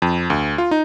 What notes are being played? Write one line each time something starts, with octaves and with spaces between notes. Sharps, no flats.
F2
D2
F4
D#4